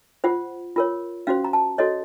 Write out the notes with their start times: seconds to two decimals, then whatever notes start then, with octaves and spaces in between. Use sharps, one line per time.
0.24 F4 C5 F#5
0.76 F4 A#4 C#5
1.27 C#4 F#4 C5 F5
1.44 A#5
1.53 A5
1.78 F#4 A4 C#5 D#5